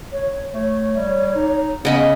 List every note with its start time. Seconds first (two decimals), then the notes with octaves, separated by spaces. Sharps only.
0.13 C#5
0.54 A3 C#5
0.96 G3
1.36 D#4
1.85 C#3 B3 D#5 B5